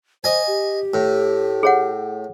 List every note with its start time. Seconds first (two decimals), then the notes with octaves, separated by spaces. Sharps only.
0.24 C5 D#5 G#5
0.47 G4
0.94 A2
1.63 G#4 C#5 F#5